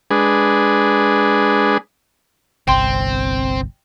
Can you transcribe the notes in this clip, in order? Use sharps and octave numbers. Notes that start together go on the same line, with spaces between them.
G#3 D4 G#4 B4
G1 C2 C4 G5 C6